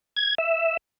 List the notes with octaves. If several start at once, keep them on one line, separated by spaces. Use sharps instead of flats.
G#6
E5